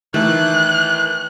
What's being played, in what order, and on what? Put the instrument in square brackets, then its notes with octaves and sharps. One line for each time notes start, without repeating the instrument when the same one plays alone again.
[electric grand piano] D#3 E3 [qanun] A3 [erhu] F#6